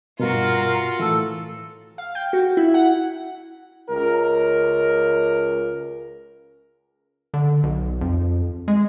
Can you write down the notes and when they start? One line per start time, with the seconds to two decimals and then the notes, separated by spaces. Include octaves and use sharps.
0.20 G2 B2 F4 F#4 A#4
1.00 A2 E3 A4
1.98 F5
2.15 G5
2.33 F#4
2.57 E4
2.74 F#5
3.90 C#2 A#4
7.34 D3
7.63 B1
8.01 F2
8.68 G#3